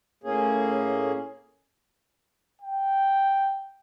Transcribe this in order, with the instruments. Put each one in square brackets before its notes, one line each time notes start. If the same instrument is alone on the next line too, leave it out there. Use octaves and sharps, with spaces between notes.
[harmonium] A2 A#3 C#4 G#4
[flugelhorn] G5